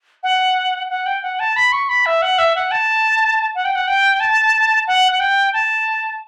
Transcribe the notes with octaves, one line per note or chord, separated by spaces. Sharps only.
F#5
F#5
G5
F#5
A5
B5
C#6
B5
E5
F#5
E5
F#5
A5
F#5
G5
F#5
G5
A5
F#5
F#5
G5
A5